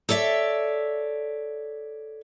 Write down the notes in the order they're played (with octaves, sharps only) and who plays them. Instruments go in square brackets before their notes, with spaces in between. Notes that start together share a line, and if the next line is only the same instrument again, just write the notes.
[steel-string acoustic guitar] A4 C#5 D5 E5